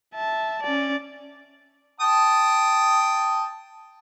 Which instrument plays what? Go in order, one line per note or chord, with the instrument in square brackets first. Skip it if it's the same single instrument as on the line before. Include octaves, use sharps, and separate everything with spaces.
[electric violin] E5 A5
C#4 D5
[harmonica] G5 A5 D#6